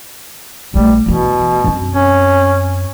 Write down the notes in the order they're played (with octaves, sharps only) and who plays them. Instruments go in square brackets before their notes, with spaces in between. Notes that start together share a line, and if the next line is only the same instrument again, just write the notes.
[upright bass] A#1 A3 [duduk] G3
[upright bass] E2 E3 [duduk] B2
[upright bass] F#2 C4
[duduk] C#4